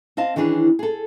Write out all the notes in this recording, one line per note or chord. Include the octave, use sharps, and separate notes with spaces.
C4 D#5 F5 A5
D#3 E3 C#4 D4 G#4
G#4 A4